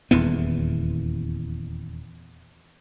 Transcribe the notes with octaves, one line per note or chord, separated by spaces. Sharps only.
D#1 E2 E3 B3